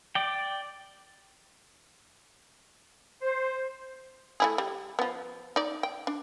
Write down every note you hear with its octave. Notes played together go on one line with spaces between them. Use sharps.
D5 G5
C5
A3 E4 G#4
G3
F3 B3
D#4 D5
G5
D4